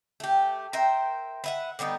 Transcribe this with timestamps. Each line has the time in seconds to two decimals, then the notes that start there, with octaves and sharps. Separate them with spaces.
0.20 A3 G4
0.73 A#4 C5 E5 G5
1.44 B4 E5 F#5
1.79 D3 G3 B3 D#4